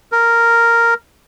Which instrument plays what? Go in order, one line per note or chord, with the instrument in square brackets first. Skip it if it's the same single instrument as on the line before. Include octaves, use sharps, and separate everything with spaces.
[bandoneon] A#4